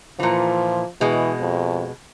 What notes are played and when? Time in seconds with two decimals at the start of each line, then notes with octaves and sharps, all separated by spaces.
0.19 A#2 E3 F3
1.01 B2 E3 G#3
1.41 F2